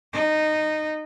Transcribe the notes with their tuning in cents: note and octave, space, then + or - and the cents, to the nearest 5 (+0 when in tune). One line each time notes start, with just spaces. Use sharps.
D#4 -15